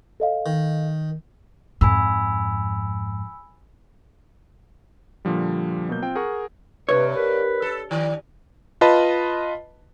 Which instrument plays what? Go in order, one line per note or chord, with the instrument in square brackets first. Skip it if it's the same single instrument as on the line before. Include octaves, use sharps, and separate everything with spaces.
[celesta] A4 D#5 F5
[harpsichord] D#3
[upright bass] F2 G#2 [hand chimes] G#5 B5 E6
[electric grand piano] A#2 D3 F3 G3
B2 F#3 A#3 G6
C4 F4 G5
G#4 A#4 F#5 C#6
[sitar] G2 [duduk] C3 [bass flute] B4 [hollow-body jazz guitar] C#5
[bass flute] A#4 [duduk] B4
[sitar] A4
[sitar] D#3 [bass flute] D5
[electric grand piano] F4 B4 D#5 A5 B5